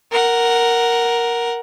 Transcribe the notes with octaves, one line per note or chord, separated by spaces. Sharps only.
A#4 F#5